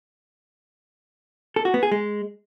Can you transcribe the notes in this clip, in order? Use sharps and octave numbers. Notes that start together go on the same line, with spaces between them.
A4
F#4
B3
G#4
G#3